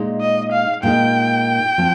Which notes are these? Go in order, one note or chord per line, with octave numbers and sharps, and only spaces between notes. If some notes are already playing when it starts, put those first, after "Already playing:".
Already playing: A#2 G#3 D#4
D#5
F5
A#2 G#3 D#4 G5
F3 C4